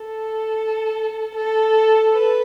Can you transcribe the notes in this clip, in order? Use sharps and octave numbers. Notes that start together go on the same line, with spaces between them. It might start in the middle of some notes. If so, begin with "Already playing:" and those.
Already playing: A4
A4
B4